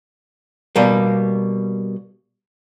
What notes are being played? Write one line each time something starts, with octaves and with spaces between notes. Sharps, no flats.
B2 G3 A#3